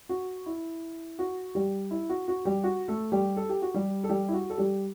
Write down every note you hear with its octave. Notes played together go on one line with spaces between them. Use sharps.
F#4
E4
F#4
G3 G4
E4
F#4
F#4
G3 G4
F#4
A3 A4
G3 G4
A4
G4
F#4
G3 G4
A4
G3 G4
E4
F#4
A4
G3 G4